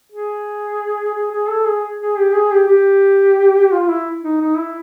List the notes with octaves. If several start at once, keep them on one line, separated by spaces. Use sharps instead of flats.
G#4
G#4
G#4
A4
G#4
G#4
G4
G#4
G4
G4
F4
E4
D#4
D#4
E4